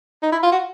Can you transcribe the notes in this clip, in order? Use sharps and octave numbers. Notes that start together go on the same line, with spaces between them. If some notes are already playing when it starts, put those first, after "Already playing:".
D#4
E4
F4
F#4